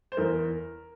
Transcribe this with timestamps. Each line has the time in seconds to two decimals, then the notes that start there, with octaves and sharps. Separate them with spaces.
0.12 C5
0.17 E2 A#4